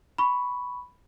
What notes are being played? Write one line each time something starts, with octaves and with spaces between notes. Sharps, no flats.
B5 C#6